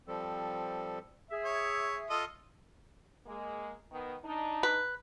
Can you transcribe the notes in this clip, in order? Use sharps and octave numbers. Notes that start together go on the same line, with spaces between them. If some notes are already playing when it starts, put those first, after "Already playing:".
F3 G3 C4 A4
G#4 E5
C#5
F4 A4 D#5
G#3 A#3
D#3 B3
D4 D#4
B4